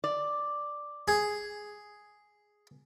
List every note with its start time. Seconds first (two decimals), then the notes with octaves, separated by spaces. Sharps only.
0.04 D5
1.08 G#4